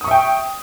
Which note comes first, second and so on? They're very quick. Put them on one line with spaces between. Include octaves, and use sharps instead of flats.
D#6 C#6 E5 G5